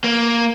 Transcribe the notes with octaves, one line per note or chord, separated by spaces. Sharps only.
A#3